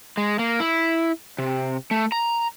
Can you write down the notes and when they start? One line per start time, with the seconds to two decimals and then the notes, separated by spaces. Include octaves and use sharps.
0.17 G#3
0.39 A#3
0.60 E4
1.38 C3
1.91 A3
2.12 A#5